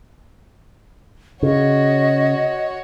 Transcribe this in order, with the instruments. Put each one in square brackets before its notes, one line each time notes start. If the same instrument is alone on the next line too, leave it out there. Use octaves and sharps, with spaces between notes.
[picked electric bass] C#3 [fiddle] F#4 C#5 [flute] D#5